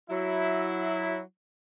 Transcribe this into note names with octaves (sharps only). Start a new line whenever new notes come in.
F#3 E4